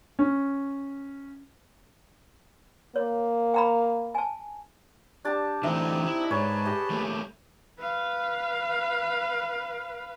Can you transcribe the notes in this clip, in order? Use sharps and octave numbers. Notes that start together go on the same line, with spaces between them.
C#4
A#3 C#5
G5 A#5 B5
G#5 A5
D4 G4 A5
D3 E3 A3 C4 D#4 D#5 E5
E4
G#2 G#4 B4 C#5 A5
G4 D#5
G3 A3 A#3
B4 F5